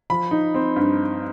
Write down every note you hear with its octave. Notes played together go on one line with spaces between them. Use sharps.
F3 B5
D#4
C4
G2